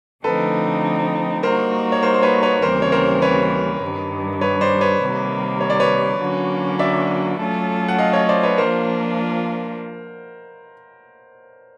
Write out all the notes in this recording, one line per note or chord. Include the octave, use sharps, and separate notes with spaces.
D3 F3 A3 C4 D#4 A4 B4
G3 A#3 D#4 F#4 A#4 C5
C#5
A#4 C5
C5
B4 C#5
B4 C#5
D#2 C#3 E3 G3 C4 A#4 C5
C#5
A#4 C5
B4 C#5
G2 D#3 G3
B4 C#5
C5 D5
B4 C#5
C3 D#3 G3 A#3
C#5
D5
B4 C#5
D3 F#3 A#3 C#4 F#4
D5 E5
F#3 A3 C#4 F4 A4
F#5
D#5 F5
C#5 D#5
C5 D5
B4 C#5
F3 A#3 D4 F4 A#4 C5